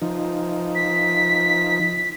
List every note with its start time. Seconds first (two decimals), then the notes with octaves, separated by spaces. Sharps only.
0.02 F3 D#4
0.75 B6